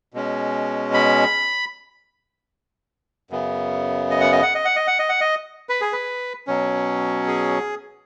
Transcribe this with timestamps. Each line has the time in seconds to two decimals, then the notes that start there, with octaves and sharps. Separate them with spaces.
0.14 B2 G#3 C#4
0.94 B5
3.31 F#2 C#3 B3
4.11 D#5
4.21 F#5
4.32 D#5
4.43 F#5
4.55 D#5
4.65 F#5
4.76 D#5
4.87 F#5
4.99 D#5
5.09 F#5
5.21 D#5
5.69 B4
5.81 G#4
5.93 B4
6.47 B2 F#3 C#4
7.27 G#4